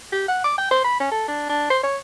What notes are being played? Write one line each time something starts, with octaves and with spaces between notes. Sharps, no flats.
G4
F#5
D6
G5
C5
B5
C#4
A4
D4
D4
C5
C#5